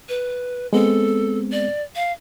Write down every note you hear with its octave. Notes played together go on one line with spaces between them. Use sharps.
B4
G#3 B3 C4 A4
D5
F5